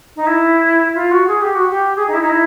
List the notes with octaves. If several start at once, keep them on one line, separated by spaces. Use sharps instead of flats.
D#4
E4
F4
F#4
G#4
G4
F#4
G4
G#4
D#4
E4
D#4
E4